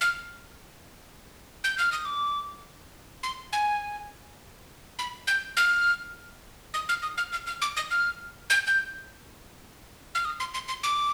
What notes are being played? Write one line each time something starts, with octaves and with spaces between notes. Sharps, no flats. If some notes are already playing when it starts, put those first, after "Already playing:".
F6
G6
F6
D#6
D6
C6
G#5
B5
G6
F6
D#6
F6
D#6
F6
F6
F6
D6
D#6
F6
G6
G6
F6
D#6
C6
C6
C6
D6